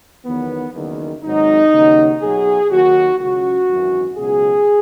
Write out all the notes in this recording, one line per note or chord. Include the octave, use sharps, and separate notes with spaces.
E2 D#3 F#3 B3
F#1 E2 D#3
G#1 G#2 F#3 D#4
D#2 C#3 F#3
B1 B2 F#3 G#4
D#2 D#3 F#3 F#4
C#2 C#3 F#3 F#4
G#1 F#2 E3
C#2 B2 F#3 G#4